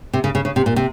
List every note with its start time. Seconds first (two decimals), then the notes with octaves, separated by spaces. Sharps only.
0.13 C3
0.24 C#3
0.35 C#3
0.45 C#3
0.56 C3
0.66 A#2
0.76 C3